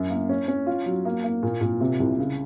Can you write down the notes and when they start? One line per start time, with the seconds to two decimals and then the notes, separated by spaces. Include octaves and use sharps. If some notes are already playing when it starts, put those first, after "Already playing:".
Already playing: F#2
0.10 A#3
0.29 C#4
0.48 C#4
0.67 F4
0.86 F#3
1.05 A#3
1.24 A#3
1.43 A#2
1.61 A#2
1.81 C3
2.00 C2
2.19 C#3